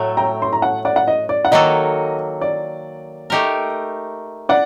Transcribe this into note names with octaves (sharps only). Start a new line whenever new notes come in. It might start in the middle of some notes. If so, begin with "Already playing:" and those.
Already playing: A2 F#3 A3
G5 A#5
C6
A#5
F#5 A5
D5 F#5
F#5
D#5
D5
F#5
D#3 F#3 A#3 F#4 A4 D#5
D5
A3 D#4 G4 A#4
D5 F#5